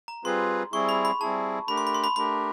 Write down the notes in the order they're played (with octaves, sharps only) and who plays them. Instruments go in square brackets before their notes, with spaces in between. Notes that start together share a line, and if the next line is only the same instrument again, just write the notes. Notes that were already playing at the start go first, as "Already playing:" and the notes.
[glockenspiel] A#5
[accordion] G3 C4 F4 G#4 B4 [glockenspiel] C6
[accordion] G3 C4 E4 G#4 [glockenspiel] C#6
[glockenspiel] B5
B5
[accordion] G3 C4 E4 G#4 [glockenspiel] A5
[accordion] A3 D4 G4 A#4 [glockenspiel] B5
[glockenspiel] C6
B5
C6
B5
[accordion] A3 D4 G4 A#4 [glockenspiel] B5